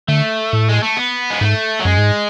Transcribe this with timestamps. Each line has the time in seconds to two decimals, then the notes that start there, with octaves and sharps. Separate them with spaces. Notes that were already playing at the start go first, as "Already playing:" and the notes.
0.08 D3 A3
0.53 A2
0.69 G#3
0.82 A3
0.97 B3
1.30 G#3
1.41 G#2 A3
1.80 F#3
1.85 F#2 G#3
1.98 G#2